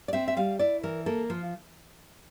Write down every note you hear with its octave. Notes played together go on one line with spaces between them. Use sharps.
D5
C4 E5
E5
G3 F5
E4 D5
E3 A#4
A#3 A4
F3 F4